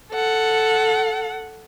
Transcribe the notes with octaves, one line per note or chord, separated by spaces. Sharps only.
A4 F#5